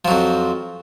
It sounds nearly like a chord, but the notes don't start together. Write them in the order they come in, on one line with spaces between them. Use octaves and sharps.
F3 F#3 F2